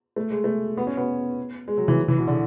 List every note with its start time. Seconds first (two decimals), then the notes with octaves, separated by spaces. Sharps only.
0.16 A3
0.30 G#3
0.44 A3
0.77 B3
0.87 C#4
0.97 B3
1.68 G#3
1.78 F#3
1.88 E3
1.98 F#3
2.08 E3
2.18 B2
2.28 D3